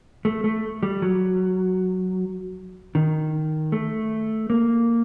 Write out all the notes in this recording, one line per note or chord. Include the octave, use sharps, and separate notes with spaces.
A3
A3
G3
F#3
D#3
A3
A#3